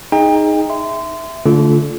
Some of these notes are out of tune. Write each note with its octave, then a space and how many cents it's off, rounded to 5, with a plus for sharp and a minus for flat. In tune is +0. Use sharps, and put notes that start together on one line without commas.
D#4 +0 G#4 +0 G5 +35
E5 +0 C6 -25
D3 -30 A3 +0 F4 +0